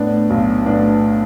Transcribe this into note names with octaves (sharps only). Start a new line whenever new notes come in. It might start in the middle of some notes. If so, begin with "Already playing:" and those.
Already playing: A2 B3 D4
B1
A2 B3 D4